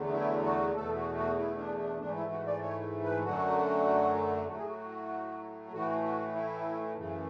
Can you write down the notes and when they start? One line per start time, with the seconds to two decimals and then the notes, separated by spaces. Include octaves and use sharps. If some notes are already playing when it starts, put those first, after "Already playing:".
Already playing: E2 D3 F#3 A3
0.13 E4
0.44 F#4
0.75 E2 B2 A3 A4
0.96 F#4
1.17 F#4
1.37 E4
1.58 D4
1.79 D4
2.00 G#2 E3 A3 D4
2.15 E4
2.31 F#4
2.47 D5
2.62 C#5
3.04 B4
3.24 F#2 D3 F#3 A3 F#4
4.48 A2 F#3 A3 F#4
4.57 G#4
4.65 F#4
5.72 A2 E3 A3 F#4
6.04 F#4
6.35 E4
6.97 F#2 C#3 E3 A3